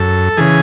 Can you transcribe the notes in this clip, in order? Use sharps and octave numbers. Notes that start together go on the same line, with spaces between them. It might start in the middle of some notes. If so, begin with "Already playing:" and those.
Already playing: F#2 A4
C#3 E3 G#4